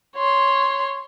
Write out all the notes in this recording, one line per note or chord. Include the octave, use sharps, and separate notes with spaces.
C#5 C6